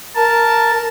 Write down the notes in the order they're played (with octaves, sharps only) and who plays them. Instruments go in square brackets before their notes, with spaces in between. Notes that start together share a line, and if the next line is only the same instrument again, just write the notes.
[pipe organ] A#4 A5